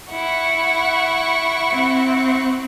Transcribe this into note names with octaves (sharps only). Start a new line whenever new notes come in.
E4 F#5 C#6
C4